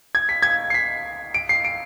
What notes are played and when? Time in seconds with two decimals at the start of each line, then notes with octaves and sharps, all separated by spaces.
0.15 G#6
0.29 B6
0.42 G#6
0.70 C7
0.74 B6
1.34 D7
1.49 C7
1.65 D7